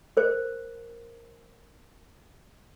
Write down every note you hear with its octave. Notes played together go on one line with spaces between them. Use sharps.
A#4 C5